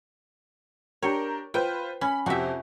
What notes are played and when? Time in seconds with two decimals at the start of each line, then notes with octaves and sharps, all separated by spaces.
1.03 D4 G4 A#4 C#5
1.54 F4 B4 C5 G5
2.01 C#4 B5
2.26 F2 C3 F#4 G4 E5